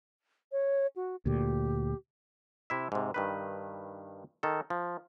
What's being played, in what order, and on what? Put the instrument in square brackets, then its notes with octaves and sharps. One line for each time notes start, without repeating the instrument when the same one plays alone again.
[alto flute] C#5
F#4
[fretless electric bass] D2 A#2 [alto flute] G4
[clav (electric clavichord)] C3 E4 E5
G#2 C3
G2 D#3 B4
D#3 A4
F3